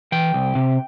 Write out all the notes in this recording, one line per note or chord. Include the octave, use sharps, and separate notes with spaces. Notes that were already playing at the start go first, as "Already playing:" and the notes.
E3 G5
C2
C3